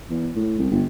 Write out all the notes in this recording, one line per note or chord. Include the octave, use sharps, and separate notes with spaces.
E2
A2
C2
G1